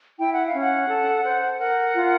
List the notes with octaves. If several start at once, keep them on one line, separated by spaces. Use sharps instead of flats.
E4 G5
F#5
F5
C#4
F#5
A4
C5
A#4 F#5
F4